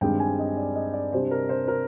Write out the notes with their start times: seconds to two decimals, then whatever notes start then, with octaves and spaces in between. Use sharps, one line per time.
0.01 G2 D#3 G#3 C4 G5
0.20 G#5
0.39 D#5
0.57 D5
0.75 D#5
0.94 D5
1.13 C3 G3 D4 C5
1.31 A#4
1.49 C5
1.68 A#4